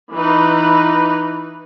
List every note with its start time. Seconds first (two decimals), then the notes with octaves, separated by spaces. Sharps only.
0.13 E3 D#4 B4